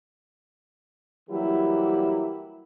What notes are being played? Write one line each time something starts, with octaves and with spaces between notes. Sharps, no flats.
E3 F#3 G3 A#3 E4 G4